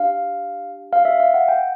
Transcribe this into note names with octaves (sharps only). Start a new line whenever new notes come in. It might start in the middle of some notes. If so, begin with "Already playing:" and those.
Already playing: D4 G4 F5
F5
E5
F5
F#5
G5